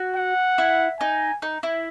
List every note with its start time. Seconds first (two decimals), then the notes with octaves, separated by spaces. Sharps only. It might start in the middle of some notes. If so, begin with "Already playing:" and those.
Already playing: F#4
0.16 F#5
0.58 E4
0.99 D#4 G#5
1.42 D#4
1.63 E4